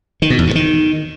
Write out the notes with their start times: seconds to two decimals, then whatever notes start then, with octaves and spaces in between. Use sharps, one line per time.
0.22 D#3
0.30 B2
0.39 E2
0.47 G2
0.55 D#3